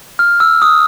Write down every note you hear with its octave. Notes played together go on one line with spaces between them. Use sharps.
F6
E6
D#6